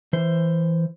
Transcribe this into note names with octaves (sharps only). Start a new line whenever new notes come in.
E3 C5